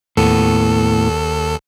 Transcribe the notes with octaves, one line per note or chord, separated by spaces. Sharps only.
D#2 A2 B3 A4